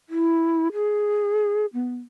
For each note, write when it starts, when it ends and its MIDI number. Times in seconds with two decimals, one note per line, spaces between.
0.09 0.68 64
0.73 1.66 68
1.74 1.97 59